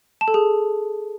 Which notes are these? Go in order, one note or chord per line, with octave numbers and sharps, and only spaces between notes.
A5
A4
G#4